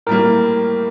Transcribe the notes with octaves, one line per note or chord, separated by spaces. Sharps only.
A2 G3 A#3 A#4